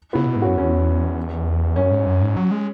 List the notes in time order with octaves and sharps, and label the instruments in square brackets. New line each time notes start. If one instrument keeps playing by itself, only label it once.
[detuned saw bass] C#3 [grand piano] B3 E4
[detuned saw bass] B2
G#2
[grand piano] C#4 F#4
[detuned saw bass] F#2
[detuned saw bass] E2 [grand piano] C#4
[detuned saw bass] F#2 [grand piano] C#4
[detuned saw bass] G#2
F#2
G#2
F#3
G#3